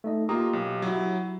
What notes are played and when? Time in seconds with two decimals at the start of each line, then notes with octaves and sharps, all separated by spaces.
0.04 A3 D#4 D#5
0.29 A#3 F4 G4 A#5 D#6
0.53 B1
0.82 F#3 E4